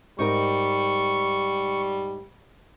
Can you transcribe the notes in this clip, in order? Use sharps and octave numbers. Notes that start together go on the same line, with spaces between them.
G#2 G3 D#4 A#4 C#6